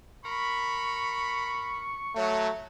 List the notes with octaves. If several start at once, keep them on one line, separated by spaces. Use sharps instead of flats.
A#4 B5 C#6
F#3 A3